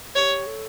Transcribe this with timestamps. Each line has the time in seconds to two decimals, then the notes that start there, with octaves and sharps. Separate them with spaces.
0.15 G4 C#5
0.47 A4